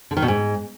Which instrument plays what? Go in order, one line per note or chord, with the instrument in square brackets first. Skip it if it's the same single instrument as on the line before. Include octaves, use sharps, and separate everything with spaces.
[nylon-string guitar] D3
D#3
B2
G#2